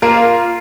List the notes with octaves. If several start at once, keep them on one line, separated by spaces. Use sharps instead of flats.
A#3 F4 A#4